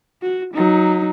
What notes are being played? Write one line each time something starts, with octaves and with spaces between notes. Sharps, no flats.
F#4
F#3 D#4